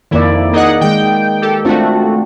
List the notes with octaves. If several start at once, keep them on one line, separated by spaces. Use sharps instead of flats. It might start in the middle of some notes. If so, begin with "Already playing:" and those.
F2 D#3 A#3 E4 D5
A#3 D#4 G#4 D#5 F#5
D#3 G#3 G5
G4 A4
A3 C4 D4 F4 F#4